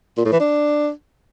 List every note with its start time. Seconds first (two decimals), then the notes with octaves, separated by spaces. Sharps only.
0.17 A#2
0.25 A2
0.33 E3
0.40 D4